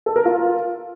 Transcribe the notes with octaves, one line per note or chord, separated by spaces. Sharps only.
A4
A#4
F4